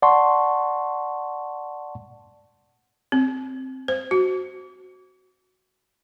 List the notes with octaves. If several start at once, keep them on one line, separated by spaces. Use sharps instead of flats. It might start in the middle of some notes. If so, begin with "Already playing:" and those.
D5 F#5 A5 C6 C#6
C4
C5
F#4